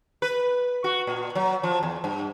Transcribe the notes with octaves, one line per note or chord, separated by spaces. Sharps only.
B4
F#4
A#2
F#3
F3
E2
G2